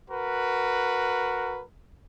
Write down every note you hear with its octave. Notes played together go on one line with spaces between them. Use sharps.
F#4 A#4 B4